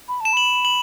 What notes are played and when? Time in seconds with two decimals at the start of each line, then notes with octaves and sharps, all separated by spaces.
0.08 B5
0.21 A5 E7
0.33 B5 F#7
0.65 F#7